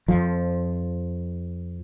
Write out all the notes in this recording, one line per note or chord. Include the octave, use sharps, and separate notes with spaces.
F2 F3